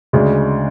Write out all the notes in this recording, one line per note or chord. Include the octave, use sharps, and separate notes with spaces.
D2 C#3 G#3 D4